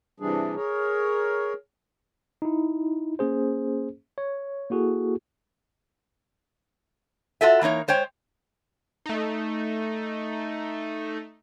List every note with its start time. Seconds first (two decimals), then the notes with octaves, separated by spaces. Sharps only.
0.20 C3 E3 G3 D4 G#4
0.56 G#4 A#4 C#5
2.42 D#4 E4
3.19 A#3 C#4 G#4 C5
4.18 C#5
4.70 A#3 E4 F#4 G#4 A4
7.41 F4 F#4 A4 E5
7.62 E3 A#3 D#4 C#5
7.88 G#3 C5 C#5 G5
9.06 A3 D#4